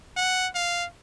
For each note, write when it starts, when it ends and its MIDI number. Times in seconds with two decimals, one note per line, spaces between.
0.16 0.47 78
0.55 0.86 77